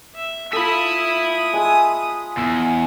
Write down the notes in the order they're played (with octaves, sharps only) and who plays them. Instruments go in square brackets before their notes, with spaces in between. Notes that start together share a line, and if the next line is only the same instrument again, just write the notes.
[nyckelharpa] E5
[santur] F4 A4 [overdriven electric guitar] E5 B5 [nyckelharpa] D#6
[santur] G#3 G#5
[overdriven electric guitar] E2 [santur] E6